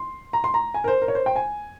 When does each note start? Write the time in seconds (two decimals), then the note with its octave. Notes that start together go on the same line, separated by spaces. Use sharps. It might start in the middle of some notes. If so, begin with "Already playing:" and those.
Already playing: C6
0.33 A#5
0.44 C6
0.54 A#5
0.74 G#5
0.84 A#4
0.88 C5
1.02 A#4
1.08 C#5
1.15 C5
1.26 G5
1.36 G#5